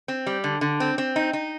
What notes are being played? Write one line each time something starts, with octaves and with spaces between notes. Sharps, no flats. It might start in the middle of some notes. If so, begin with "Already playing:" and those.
C4
G3
D3
D3
C4
C4
D#4
D#4